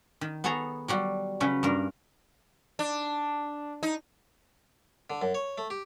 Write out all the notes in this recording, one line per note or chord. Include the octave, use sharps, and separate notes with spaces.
D#3
B3 G#4 A4 C#5 A#5
F#3 G3 F#4
C#3 F#3 C#4 B4
G2 A#3 A#4
D4
D#4
D3
F#2
C#5
A3
G4